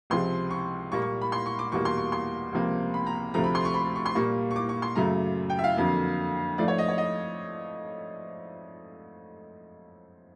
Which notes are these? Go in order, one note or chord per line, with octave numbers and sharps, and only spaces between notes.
C#2 C3 F3 G#3 C6
C#6
A#2 G3 A#3 C#6
C#6
B5
C6
C#6
D6
E2 B2 G3 A#3 C#6
C6
C#6
C6
C#2 C3 F3 A#3
B5
A#5
D2 C3 F3 A3 A#5
B5
C6
C#6
B5
C#6
C6
A#2 G3 A#3 C#6
C#6
D6
C#6
C6
F#2 C#3 F#3 A3 A#5
G5
E5
F5
F2 D3 F#3 A#3
G#2 F3 A3 D5
C#5
D#5
C#5
D#5